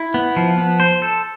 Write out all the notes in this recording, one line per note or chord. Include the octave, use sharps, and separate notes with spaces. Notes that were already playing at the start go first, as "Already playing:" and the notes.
Already playing: E4
B3
F3
B3
C5
A4